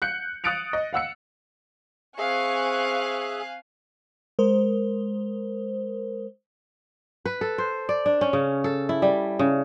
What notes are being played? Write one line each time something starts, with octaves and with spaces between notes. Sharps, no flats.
F#6 G6 C#7
D#6 F#6 A6 C#7 D7 F7
D#5
F5 F#5 E6 C#7
C4 G#4 E5 F5 G#5 C#6 F#6
G#3 A#4 C5
B4
A4
C5
D5
D4
C#4
C#3
A4
E4
G3
C#3